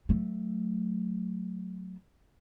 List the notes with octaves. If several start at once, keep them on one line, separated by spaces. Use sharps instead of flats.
F#3 A3